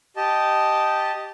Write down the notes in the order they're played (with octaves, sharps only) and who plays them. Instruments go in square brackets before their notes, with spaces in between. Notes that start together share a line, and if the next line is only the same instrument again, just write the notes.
[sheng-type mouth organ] G4 D#5 A5